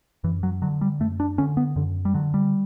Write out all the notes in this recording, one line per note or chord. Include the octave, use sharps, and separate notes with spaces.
F#2 E3
F#3
D3 F#3
G3
F#2 A3
D4
D3 C#4
B3
F#2 D3
G3
D3 F#3
G3